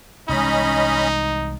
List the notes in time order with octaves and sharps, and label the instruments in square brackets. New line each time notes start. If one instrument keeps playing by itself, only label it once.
[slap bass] C2 E3 G#3 [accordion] C#4 D#5 B5 [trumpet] D#4